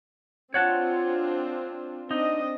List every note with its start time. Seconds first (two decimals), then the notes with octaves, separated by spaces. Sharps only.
0.54 C4 D4 F4 C#5 F#5 A5
2.11 C4 D4 D#4 D#5